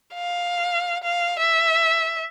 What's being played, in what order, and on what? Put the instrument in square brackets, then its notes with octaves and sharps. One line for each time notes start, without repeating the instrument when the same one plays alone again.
[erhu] F5
F5
E5